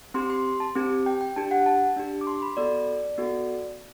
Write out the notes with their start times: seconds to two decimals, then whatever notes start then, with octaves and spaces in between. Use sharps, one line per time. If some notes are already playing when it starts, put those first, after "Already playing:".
0.14 C4 G4 C6
0.30 C6
0.60 A5
0.75 C4 G4
1.06 G5
1.21 G5
1.36 D4 G4 A5
1.51 F#5
1.66 A5
1.96 D4 G4
2.21 D6
2.27 C6
2.42 B5
2.57 B3 F#4 A4 D5
3.18 B3 F#4 A4